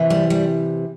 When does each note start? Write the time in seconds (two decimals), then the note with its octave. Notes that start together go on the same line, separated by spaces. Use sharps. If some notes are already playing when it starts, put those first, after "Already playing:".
Already playing: C3 E3
0.10 G3
0.30 G3